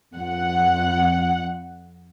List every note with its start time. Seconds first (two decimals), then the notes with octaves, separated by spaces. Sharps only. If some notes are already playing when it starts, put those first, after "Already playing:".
0.16 F2 F#5